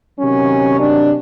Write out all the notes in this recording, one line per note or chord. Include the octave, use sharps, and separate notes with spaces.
C3 D#3 F#3 C#4
D4